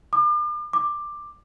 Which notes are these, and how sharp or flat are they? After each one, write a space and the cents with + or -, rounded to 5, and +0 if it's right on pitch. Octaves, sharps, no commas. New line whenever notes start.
D6 +40
D6 +10